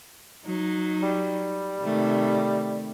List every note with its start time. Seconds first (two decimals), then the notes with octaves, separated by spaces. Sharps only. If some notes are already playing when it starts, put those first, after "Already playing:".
0.46 F#3 D#4
1.03 G3
1.81 C3 D#3 A3